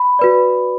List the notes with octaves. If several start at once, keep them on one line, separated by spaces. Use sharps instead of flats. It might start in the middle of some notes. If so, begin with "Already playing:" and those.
Already playing: B5
F#4 B4 D5